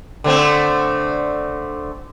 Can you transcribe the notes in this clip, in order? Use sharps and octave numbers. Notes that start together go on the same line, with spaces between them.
D3 A3 C4